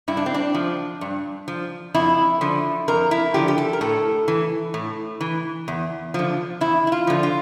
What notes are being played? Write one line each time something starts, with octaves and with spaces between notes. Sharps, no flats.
G2 E4
D4
C4
D4
F3
G2
F3
F2 E4
D3 F3
F2 A#4
E4
D3 F3 G4
G4
A4
A#4
A2 A4
E3
A2
E3
E2
D3 F3
E2 E4
E4
F4
D3 F3
F4